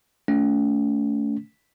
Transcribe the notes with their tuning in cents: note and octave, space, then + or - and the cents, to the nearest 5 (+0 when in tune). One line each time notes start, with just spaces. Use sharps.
A3 -5 C#4 +40